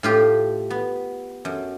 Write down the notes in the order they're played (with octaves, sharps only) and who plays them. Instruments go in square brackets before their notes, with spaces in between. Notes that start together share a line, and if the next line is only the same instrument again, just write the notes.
[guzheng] A2 F4 G4
B3
F#2